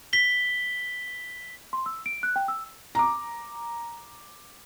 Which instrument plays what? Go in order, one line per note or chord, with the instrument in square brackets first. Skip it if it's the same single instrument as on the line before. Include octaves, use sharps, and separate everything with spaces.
[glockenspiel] B6 G7
[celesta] C6
E6
D7
F#6
G5
E6
[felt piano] A#5 D6